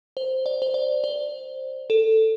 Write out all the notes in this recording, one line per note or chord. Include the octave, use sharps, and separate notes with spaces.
C5
D5
C5
D5
C5
A4